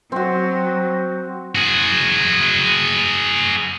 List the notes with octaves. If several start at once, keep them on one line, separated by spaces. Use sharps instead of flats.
F#3 C4 F#4
F#4 G#4